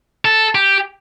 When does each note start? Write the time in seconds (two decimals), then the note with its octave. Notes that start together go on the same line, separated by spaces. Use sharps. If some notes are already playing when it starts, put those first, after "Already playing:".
0.25 A4
0.55 G4